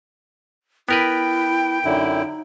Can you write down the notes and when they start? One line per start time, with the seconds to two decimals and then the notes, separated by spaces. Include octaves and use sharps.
0.89 B3 E4 A#4 B4 G5
1.85 F#2 D3 D#4 E4